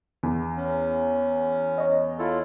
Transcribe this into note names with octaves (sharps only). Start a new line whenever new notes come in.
E2
C#4
C#5 D#5
E4 F4 A4